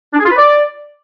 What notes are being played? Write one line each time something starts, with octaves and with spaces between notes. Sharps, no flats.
D4
G#4
F4
B4
D5